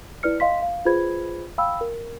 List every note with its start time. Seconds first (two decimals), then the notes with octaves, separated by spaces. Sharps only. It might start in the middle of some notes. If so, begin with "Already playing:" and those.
0.23 E4 B4 D5 F6 C#7
0.40 D#5 F5 C6 B6
0.62 F5
0.85 F4 G#4 B4 C5 B5 G#6
1.58 F5 G5 B5 E6
1.81 A#4